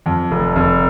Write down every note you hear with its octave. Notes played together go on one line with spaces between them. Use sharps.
F2
F1
F1